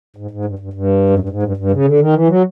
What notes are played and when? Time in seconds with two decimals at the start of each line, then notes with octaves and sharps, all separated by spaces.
0.16 G#2
0.31 G#2
0.45 G2
0.59 G2
0.73 G2
1.10 F#2
1.19 G2
1.29 G#2
1.43 G2
1.57 G2
1.71 C#3
1.85 D3
2.00 D#3
2.13 E3
2.28 F#3